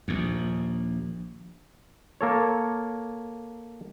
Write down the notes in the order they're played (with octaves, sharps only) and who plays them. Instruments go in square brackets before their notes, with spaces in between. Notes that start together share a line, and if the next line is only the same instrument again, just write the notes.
[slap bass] A#1 D#2
[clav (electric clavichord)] A#3 A4 C#5